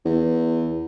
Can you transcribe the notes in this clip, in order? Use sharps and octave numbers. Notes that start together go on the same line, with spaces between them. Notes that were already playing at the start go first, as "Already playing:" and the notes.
E2